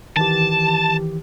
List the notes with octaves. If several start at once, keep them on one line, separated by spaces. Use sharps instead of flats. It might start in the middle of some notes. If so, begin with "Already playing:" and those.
D#3 E3 G4 A5